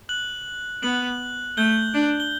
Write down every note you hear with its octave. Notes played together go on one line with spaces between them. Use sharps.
F#6 F#7
B3 F#6 F#7
A3 G6 G7
D4
G7